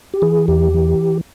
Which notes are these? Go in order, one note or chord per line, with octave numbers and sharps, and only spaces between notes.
G4
E3 G#4
E2 G4
E3